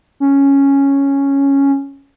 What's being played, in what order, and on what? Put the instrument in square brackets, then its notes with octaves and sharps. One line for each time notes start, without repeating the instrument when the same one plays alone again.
[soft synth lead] C#4